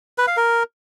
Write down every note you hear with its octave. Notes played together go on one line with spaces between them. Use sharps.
B4
F5
A#4